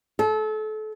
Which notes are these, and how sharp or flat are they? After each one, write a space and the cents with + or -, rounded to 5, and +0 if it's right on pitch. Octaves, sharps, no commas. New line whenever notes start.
A4 -30